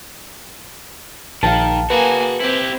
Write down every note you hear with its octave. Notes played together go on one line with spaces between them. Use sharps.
A#1 D#3 F5 A5
A#3 F#4 G#4 B4 G#5
C4 E4 G4